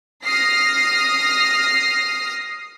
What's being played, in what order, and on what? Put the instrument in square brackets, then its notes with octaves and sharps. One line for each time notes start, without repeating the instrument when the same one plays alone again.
[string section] D#6 F6 A#6 C7